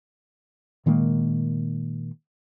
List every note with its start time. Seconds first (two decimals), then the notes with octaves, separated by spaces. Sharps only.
0.86 A#2 D#3 G#3 A#3